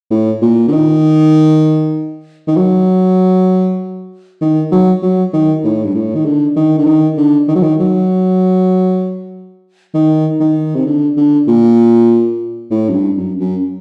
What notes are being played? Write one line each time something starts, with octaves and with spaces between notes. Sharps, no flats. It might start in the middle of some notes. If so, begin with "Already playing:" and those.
A2
A#2
D3
D#3
D#3
F#3
D#3
F#3
F#3
D#3
A2
G2
A2
D#3
D3
D#3
D3
D#3
D3
D#3
F#3
D#3
F#3
D#3
D#3
C3
D3
D3
A#2
A2
F#2
G2
F#2
F#2